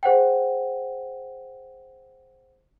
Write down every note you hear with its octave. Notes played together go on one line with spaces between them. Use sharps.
G#4 C5 F#5 G5